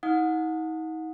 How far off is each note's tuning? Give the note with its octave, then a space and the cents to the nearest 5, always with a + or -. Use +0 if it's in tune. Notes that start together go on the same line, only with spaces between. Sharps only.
D#4 +40 F#5 -30 D#6 +0